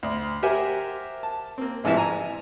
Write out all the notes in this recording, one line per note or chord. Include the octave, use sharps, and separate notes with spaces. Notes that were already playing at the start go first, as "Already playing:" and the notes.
D2
G4 A#4 C5 E5 F#5 G#5
A5
A#3 C4
A1 G#2 C3 E3 F3 E5
G#5 A#5